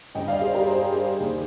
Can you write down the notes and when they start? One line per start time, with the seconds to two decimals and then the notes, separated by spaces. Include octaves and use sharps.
0.15 G2 D3 D#5 G5
0.28 D5 F5
0.41 G#4 C5
0.54 G4 A#4
0.67 G#4 C5
1.20 D#2 D#3